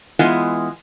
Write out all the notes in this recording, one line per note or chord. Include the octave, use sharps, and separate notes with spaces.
E3 G#3 B3 F4 D#5 G#5